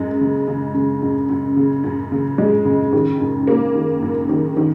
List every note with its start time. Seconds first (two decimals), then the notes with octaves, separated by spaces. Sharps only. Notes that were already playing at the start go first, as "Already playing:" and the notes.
Already playing: F#2 G#3
0.21 C#3
0.47 C#3
0.74 C#3
1.02 F#2
1.29 F#2
1.56 C#3
1.84 F#2
2.12 C#3
2.38 G#3
2.65 C#3
2.92 D#3
3.20 F#2
3.47 A#3
3.75 D#3
4.02 F#2
4.29 D#3
4.57 D#3